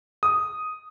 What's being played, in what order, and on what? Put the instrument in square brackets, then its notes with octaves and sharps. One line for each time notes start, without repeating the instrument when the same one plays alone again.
[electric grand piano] D#6